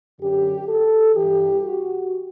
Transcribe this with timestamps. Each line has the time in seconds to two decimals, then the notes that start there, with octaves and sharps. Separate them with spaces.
0.19 F#2 D3 G4
0.67 A4
1.15 G2 E3 G4
1.63 F#4